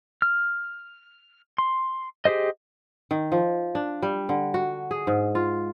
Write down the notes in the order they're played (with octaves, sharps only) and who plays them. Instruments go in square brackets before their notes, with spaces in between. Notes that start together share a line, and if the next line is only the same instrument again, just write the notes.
[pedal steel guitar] F6
C6
G4 G#4 C5 D#5
[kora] D#3
F3
D4
G3
D3
F#4
G#4
G#2
F4